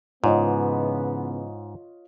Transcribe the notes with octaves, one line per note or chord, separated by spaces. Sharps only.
G#2 C#3 E3 B3 F4 C#5 D#5